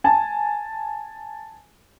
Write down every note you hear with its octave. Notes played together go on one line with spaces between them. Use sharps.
G#5 A5